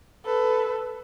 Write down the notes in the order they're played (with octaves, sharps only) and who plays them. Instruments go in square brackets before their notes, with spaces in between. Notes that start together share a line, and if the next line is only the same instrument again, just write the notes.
[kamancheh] A4 B4